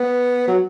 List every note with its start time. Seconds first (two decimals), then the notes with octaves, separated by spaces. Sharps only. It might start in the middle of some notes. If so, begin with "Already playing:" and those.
Already playing: B3
0.47 F#3